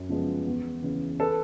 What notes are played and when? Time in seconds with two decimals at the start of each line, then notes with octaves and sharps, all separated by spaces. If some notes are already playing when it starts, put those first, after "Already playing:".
Already playing: F#2
0.09 C#3 F3 G#3 B3
0.47 E2
0.82 C#3 E3
1.20 A4 B4